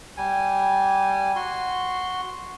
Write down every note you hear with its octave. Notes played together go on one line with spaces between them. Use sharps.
G3 G#5
F#4 C6